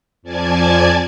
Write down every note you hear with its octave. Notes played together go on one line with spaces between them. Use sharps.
F2 F3 D5 G#5 A5 G#6